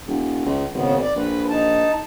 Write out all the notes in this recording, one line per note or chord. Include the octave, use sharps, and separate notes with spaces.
E1
C#2
G#1 C#3 B3
D5
A#1 B4
D#4 A5